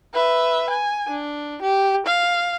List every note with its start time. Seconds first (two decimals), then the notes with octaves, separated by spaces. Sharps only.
0.14 B4 E5
0.70 G#5
1.08 D4
1.62 G4
2.06 F5